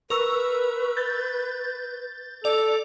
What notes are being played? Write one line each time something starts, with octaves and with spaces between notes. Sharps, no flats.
A#4 B4 C#6 E6
G6 A6
A4 D5 F7